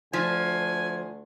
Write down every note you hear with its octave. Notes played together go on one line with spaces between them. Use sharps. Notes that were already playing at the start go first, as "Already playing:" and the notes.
D2 F3 G#5